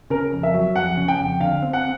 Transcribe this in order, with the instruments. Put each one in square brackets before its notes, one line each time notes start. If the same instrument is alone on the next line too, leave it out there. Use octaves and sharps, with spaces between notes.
[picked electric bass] C#3 [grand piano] A#4
[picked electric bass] F2
[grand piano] E5
[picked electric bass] F#3
[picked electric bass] F2 [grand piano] F#5
[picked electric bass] C#3
[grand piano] G5
[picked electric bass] F2
[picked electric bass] D3 [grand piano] F5
[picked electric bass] C4
[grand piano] F#5